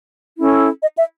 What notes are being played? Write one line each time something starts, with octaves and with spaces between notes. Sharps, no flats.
C#4 E4 A4
D#5
E5